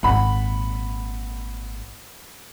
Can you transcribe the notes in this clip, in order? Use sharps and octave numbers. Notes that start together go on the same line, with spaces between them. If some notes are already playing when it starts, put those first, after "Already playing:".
G#1 A#2 F#5 B5